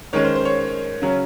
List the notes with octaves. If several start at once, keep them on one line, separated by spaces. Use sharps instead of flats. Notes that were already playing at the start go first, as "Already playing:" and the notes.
D#3 G#3 C#4 C#5
C5
C5
C#5
C#3 F#3 C#4